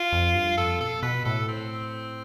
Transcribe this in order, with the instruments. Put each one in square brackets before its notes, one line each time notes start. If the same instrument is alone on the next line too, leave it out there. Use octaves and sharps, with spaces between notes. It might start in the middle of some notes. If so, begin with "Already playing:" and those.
Already playing: [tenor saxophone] F4
[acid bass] F2
G2
[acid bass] F2 [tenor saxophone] A4
[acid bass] B2 [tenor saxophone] A4
[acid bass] B2 [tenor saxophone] B4
[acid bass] A2 [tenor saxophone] A4
[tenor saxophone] C4